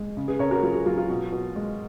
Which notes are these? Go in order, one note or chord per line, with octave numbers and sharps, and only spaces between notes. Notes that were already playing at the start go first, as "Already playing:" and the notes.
Already playing: G#3
C#3
G#4 B4
C#3 A#4 C#5
F#4 A#4
F#3 F4 G#4
F#4
F#3 F4
F4
B2
B2
G#3